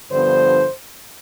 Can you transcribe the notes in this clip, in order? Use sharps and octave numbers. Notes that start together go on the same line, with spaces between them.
G2 D3 F3 B3 C5